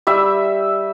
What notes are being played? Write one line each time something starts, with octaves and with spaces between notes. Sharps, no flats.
G3 E5 E6